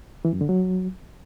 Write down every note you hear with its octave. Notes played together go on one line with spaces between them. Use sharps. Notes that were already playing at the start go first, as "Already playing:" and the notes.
E3
F#2
D3
F#3